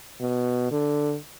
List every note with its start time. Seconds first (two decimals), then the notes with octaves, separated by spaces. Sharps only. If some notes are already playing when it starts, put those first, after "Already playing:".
0.21 B2
0.71 D3